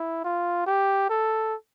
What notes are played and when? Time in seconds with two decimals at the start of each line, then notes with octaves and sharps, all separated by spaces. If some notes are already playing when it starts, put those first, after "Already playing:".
Already playing: E4
0.24 F4
0.67 G4
1.10 A4